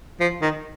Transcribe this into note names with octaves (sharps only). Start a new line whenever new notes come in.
F3
D#3